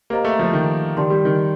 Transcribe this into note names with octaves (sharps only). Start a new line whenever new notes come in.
A#3 G4 C5 D#5 A#5
A3
F3
D#3
D#3 G4 D5 A5 C6
G3
D#3